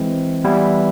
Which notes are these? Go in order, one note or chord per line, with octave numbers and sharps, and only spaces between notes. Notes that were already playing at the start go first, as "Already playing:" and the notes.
Already playing: E3 G#3 C4 E4
E3 G3 B3 E4